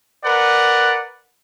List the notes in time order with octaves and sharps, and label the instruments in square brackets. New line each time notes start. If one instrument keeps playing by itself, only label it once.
[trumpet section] A#4 B4 D5 F#5